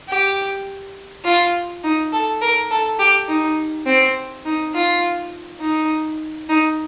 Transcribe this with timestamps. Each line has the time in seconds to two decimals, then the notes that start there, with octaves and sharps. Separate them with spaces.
0.09 G4
1.25 F4
1.83 D#4
2.12 A4
2.41 A#4
2.71 A4
2.99 G4
3.28 D#4
3.86 C4
4.45 D#4
4.74 F4
5.60 D#4
6.49 D#4